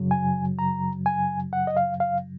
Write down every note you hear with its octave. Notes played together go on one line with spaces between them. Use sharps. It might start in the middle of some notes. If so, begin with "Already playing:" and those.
Already playing: F#2 C#3 F#3
G#5
A#5
G#5
F#5
D#5
F5
F5